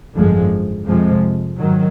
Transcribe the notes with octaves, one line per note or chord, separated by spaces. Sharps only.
G#1 F#2 D3 F3 G#3
F2 C3 F3 G#3
G#2 D#3 F#3